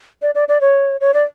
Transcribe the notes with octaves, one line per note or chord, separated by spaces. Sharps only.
D5
D5
D5
C#5
C#5
D5